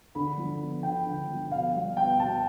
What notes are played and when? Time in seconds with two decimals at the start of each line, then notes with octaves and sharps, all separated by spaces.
0.15 D3 B5
0.38 F3
0.61 B3
0.83 D3 G5
1.06 D3
1.29 F3
1.51 B2 F5
1.74 G3
1.97 B3 G5
2.19 B2 A5